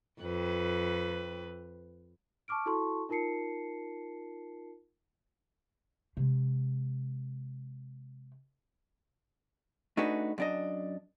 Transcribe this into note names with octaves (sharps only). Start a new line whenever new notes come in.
F2 B4
A5 C#6 D6 F6 D7
E4 F#4 A4 A5 C6 C#6
D#4 F4 A#4 A5 C7 C#7
C3 G#3
A3 D4 D#4 F#4 G#4 B4
F#2 D4 D#5